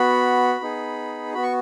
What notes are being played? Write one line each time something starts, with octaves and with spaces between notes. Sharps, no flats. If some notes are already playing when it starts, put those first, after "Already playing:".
Already playing: B3 F#4 B5
B3 D#4 G#4
B3 F#4 B5
C#6